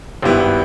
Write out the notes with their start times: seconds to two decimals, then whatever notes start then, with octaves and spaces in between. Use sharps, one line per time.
0.22 G#1 G2 G3 B3 E4